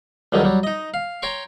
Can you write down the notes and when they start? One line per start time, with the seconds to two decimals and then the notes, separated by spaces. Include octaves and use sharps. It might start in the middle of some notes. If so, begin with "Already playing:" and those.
0.32 C#2 D3 D#3 F#3 G3
0.44 F#3 G3
0.63 D#4 D#5
0.94 F5
1.22 C#5 G5 A#5 C6 C#6